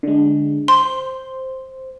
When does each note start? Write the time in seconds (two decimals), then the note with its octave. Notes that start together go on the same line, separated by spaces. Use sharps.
0.03 D3 G#3
0.68 C5 C6